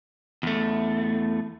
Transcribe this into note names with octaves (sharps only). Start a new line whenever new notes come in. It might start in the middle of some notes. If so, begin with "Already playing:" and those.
E2 A3